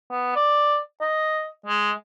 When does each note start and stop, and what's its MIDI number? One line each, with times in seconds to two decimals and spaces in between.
0.10 0.33 59
0.36 0.79 74
1.01 1.48 75
1.66 1.91 56